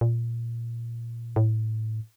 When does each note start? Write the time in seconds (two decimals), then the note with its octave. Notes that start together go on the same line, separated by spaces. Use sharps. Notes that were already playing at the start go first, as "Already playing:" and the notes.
0.01 A#2
1.36 A2